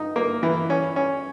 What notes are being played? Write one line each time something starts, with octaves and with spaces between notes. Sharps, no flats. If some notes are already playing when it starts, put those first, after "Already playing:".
Already playing: D#4
A#3
E3
C#4
C#4